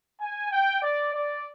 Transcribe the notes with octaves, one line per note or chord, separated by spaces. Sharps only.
G#5
G5
D5
D5